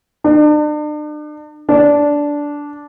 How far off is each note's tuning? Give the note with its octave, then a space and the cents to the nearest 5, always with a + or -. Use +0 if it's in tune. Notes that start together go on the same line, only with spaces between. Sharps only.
D4 +40
D4 -10